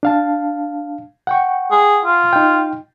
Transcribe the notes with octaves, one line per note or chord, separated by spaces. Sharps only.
D4 F5 A5
F#5 G5 C#6
G#4
F4
D#4 G5